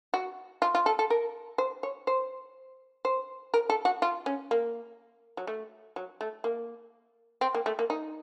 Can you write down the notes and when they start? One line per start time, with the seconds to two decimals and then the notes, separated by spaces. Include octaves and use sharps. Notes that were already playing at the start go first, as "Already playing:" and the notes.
0.14 F#4
0.62 F4
0.75 F4
0.86 A4
0.99 A4
1.10 A#4
1.58 C5
1.83 C#5
2.07 C5
3.05 C5
3.54 A#4
3.70 A4
3.85 F#4
4.02 F4
4.26 C#4
4.51 A#3
5.37 F#3
5.47 A3
5.96 F#3
6.21 A3
6.44 A#3
7.41 C4
7.55 A#3
7.66 A3
7.79 A#3
7.90 D#4